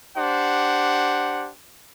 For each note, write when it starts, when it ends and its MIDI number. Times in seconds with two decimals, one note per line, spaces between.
0.17 1.50 62
0.17 1.50 67
0.17 1.50 72
0.17 1.50 78